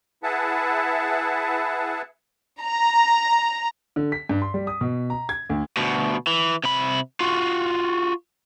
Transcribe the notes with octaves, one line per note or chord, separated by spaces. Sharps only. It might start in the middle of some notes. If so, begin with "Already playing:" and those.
E4 G#4 B4 E5 F#5 A5
A#5
D3
B6
G2
C6
G3
D#6
B2
A#5
G#6
D2
D2 B2
E3
C3 B5
F4 F#4